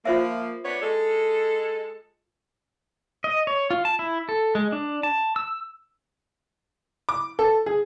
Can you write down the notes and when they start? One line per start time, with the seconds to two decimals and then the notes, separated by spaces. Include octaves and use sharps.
0.05 F3 A#3 F4 C5 E5
0.64 B3 D4 C#5
0.82 G#3 A4
3.24 D#5
3.47 C#5
3.71 F4
3.85 A5
3.99 E4
4.29 A4
4.55 G#3
4.72 D4
5.03 A5
5.36 E6
7.09 D6
7.39 A4
7.66 G#4